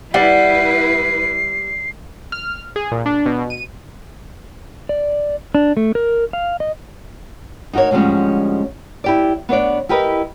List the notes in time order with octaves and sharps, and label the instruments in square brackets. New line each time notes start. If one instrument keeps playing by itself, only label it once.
[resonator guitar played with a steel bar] G3 [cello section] E4 B4 [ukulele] D5 F#5 [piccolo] C7
[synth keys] F6
G#4
A#2
D4
B2
D#7
[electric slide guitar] D5
D4
A3
A#4
F5
D#5
[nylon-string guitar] D#4 F#4 G4 A#4 C#5
D2 G#2 F3 G3 G#3 C#4
E4 G4 D5
B3 D4 C#5 D5
E4 G4 A#4 B4 D#5